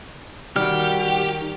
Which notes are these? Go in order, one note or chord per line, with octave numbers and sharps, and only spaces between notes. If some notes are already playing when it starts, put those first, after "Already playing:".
D#3 G3 F#4 G4 F6